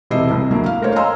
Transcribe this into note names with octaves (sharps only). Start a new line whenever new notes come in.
E1 C3 E4 D#5 E6 C7
C2
D3 F#3 A#3 E4
F5
A3 A#4 C5 C#5
D#5 F5 G#5 A#5 C6 E6